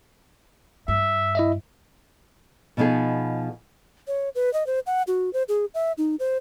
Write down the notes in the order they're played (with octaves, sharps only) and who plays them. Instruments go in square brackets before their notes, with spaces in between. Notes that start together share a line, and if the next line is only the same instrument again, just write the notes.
[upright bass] G2 [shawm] E5
[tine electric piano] E4 D#5 E5
[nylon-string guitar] B2 F3 B3 D#4 G#4
[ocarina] C#5
B4
D#5
C5
F#5
F#4
C5
G#4
E5
D#4
C5